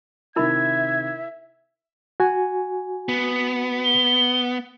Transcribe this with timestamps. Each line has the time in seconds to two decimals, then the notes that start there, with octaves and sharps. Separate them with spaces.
0.36 C3 D#3 E4 A#4 E5 B5 G#6
2.20 F#4 G#5
3.09 B3
3.84 G7